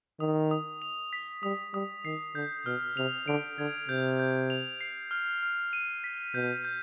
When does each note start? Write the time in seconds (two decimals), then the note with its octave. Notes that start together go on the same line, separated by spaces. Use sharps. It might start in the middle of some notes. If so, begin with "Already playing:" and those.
0.20 D#3 D#6
0.51 D#6
0.82 F7
1.13 B6
1.43 G3 D#6
1.74 G3 D#6
2.05 D#3 C7
2.35 D3 G6
2.66 B2 F6
2.97 C3 F7
3.27 D3 D7
3.58 D3 G#6
3.88 C3 G6
4.20 G6
4.50 F7
4.81 C7
5.11 F6
5.43 F6
5.73 D#7
6.04 B6
6.34 B2 G6
6.65 G6